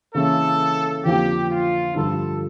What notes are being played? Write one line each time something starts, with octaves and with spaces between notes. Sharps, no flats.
C#3 E3 A#3 C#4 E4 A4
F2 D3 F3 A#3 G4
F4
G2 D3 F3 A4